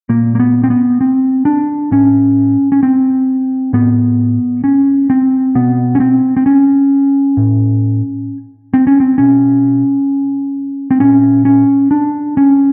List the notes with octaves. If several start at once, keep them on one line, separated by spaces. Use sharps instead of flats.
A#2 A#3
A#3
B3
C4
B3
C4
D4
A2 C#4
C#4
C4
A2 B3
C#4
C4
B2 B3
C#4
C4
C4
C#4
A2
C4
C#4
C4
B2 C#4
C4
A#2 C#4
C#4
D4
C#4